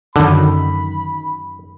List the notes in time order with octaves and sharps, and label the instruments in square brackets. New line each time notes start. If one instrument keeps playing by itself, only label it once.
[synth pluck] F#2 D#3 [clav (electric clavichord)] D3 [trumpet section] B5